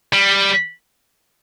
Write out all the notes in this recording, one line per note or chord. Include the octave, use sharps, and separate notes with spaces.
G3